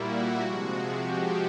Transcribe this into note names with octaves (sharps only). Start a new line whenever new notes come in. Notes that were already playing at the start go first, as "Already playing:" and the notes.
Already playing: A#2 G3 A#3 E4 F#4
C3 F3 G#3
G4